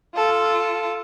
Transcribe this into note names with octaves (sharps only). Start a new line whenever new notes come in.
F4 A4